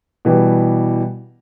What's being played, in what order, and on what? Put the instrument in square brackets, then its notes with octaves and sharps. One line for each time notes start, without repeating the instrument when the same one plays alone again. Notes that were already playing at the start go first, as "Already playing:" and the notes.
[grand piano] B2 E3 G3 B3 G4